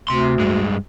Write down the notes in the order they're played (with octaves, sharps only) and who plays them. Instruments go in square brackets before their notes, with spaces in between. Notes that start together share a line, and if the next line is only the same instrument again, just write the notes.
[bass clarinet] D2 [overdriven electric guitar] C3 C6
[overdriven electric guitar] G2 G#3